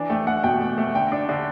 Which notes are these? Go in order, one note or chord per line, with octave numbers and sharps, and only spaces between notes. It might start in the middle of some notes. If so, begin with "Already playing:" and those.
Already playing: E3 D4
A3 G5
A3 F#5
B2 G5
A3
A3
D3 G5
D4
D3